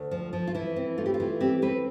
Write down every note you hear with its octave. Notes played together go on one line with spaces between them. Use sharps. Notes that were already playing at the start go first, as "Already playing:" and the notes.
Already playing: D2
F3
F3
F4
E3 E4
C4
A3 F4
G4
F4
E3
C4 G4
C4 B4